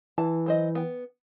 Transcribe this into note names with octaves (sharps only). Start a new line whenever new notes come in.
E3 A5
F#3 C5 D#5
B3 G5